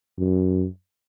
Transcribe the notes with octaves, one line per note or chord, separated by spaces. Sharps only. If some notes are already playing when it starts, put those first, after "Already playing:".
F#2